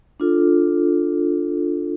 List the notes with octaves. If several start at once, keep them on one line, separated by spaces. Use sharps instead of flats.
D4 F4 A4